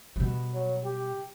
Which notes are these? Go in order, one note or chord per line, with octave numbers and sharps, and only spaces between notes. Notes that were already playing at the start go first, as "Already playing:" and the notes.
B2 G3
F#3
G4